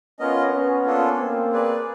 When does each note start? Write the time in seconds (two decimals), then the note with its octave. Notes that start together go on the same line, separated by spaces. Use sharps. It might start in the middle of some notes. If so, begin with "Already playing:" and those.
0.19 B3 C#4 F4 A#4 D#5
0.53 B3 C#4
0.86 A#3 D4 F4 A4
1.19 A#3 C4
1.52 G#4 B4 D5